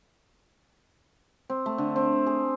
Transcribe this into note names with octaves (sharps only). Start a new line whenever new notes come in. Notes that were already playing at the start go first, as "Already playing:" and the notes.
C4
A3
D3
C4
G#4